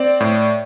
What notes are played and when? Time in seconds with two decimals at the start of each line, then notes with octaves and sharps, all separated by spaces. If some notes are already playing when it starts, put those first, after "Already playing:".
Already playing: C4 D5
0.20 A2